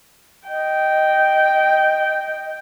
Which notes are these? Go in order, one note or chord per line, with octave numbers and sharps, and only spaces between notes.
D#5 G5